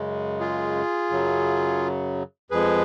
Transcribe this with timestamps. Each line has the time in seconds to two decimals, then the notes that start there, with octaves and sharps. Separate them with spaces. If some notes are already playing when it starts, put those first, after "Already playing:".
Already playing: F#2 C#3 G#3
0.40 F4 G#4
1.10 F#2 C#3 F#3
2.51 F2 F3 G#3 G#4 B4